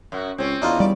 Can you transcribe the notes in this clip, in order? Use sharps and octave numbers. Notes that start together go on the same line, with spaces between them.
F#2 F#4
C#2 C4 C#4
E2 D4 D#4 F4
G3 D5